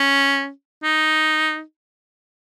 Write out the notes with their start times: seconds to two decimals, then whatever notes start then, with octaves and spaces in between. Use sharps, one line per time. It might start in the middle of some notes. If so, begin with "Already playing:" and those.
Already playing: C#4
0.84 D#4